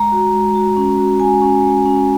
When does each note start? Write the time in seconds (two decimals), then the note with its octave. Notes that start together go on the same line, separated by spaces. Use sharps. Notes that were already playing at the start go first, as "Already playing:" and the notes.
Already playing: G#3 A#5
0.12 F#4
0.33 G#3
0.55 F#4
0.77 C#4
0.98 F#4
1.20 G#3 G#5
1.42 C#4
1.63 G#3
1.86 C#4